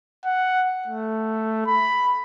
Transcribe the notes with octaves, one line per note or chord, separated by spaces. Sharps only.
F#5
A3
B5